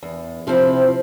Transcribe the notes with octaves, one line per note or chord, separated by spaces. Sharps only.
E2
C3 F3 C4 E4